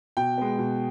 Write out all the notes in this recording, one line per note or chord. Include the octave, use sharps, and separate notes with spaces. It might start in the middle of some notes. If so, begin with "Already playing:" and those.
B2 G5
G#3 B3
B2